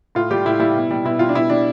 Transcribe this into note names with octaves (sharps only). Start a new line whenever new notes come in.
A2 F4
G3 G4
A2 E4
G3 E4
B2
G3
B2 E4
G3 F4
D4
B2 E4
G3 D4